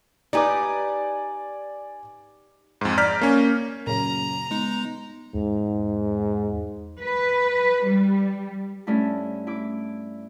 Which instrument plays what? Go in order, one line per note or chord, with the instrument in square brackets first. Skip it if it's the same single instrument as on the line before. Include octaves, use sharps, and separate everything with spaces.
[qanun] D#4 G4 B4 [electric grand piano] D5 G#5 D6
[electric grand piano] F2 G#2
D5 A#5 F6 G6 B6
A#3 C#4
[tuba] F#2 [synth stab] A#2 C#3 [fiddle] A#5
[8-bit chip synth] G#3 D#4 [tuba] B3
[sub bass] E2 [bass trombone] G#2
[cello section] B4
G3
[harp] G2 A3 C#4 D4 E4
E4 D6